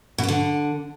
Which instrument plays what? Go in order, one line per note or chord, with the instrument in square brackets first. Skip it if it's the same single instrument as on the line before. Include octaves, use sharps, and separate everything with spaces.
[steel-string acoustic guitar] B2
B3
D3